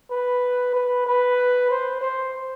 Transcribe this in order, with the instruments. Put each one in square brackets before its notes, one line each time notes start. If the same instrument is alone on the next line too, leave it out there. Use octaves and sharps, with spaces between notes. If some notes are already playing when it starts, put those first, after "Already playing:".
[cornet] B4
B4
B4
C5
C5